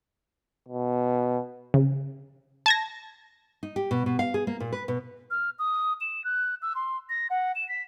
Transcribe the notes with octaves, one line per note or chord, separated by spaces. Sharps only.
B2
C#3
A5 G#6 A#6
D#4
G4
B2
B2
F5
G#4
A#3
A#2
B4
B2
F6
D#6
E7
F#6
E6
C6
A#6
F#5
E7
B6